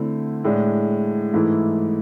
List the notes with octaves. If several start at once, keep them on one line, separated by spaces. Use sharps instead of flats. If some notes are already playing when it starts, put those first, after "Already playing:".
Already playing: D3 A3 C4 E4
A2 G#3 D4
G#2 E3 A3 E4